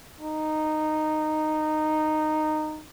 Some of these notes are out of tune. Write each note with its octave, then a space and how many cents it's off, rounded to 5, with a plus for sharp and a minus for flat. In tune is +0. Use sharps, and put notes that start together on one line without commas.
D#4 -10